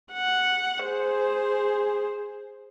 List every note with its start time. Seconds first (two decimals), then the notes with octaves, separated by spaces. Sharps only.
0.13 F#5
0.85 G#4 C5